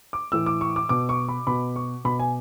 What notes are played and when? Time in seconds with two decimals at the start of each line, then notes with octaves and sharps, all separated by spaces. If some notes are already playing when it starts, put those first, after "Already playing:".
0.13 D6
0.32 A2 E3 E6
0.46 D6
0.61 C#6
0.76 D6
0.89 B2 D6
1.09 C#6
1.29 B5
1.47 B2 B5
1.76 C#6
2.05 B2 B5
2.19 G#5